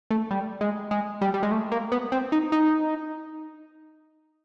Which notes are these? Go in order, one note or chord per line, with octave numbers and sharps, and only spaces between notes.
A3
G3
G#3
G#3
G3
G3
G#3
A3
A#3
B3
C4
D#4
D#4